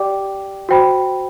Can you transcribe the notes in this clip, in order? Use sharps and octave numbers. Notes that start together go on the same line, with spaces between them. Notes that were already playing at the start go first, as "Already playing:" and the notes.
Already playing: G4 D5 G5 D6
F#4 C5 G5 B5